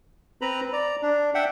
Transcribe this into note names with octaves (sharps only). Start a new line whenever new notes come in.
C4 B4 A#5 B5
D5 A#5
D4
E5 F#5 G5